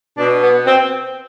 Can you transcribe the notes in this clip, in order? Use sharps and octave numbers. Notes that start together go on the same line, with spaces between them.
B2 D4
B3
C4